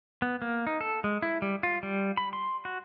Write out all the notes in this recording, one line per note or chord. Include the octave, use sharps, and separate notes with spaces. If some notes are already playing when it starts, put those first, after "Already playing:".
B3
A#3
D#4
A4
G#3
E4
G3
F4
G3
B5
C6
F#4